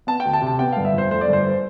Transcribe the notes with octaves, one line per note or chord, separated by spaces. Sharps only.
B3 A5
G5
D2
A5
C3
A5
B3 G5
F5
G1
E5
F2 C5
A3 C5
D5
G1
C5